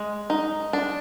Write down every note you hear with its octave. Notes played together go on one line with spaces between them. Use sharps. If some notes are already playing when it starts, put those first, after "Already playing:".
Already playing: G#3
D#4
D4